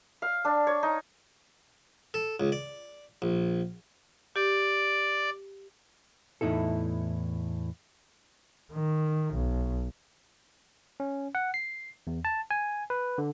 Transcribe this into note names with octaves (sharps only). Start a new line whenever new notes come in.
F5
D4
C#5
D#4
A4
C#2
D5
A#1
G4 D5
E2 A2 D#4 E4 A4
D#3
B1
C#4
F#5
C7
E2
A5
G#5
B4
D3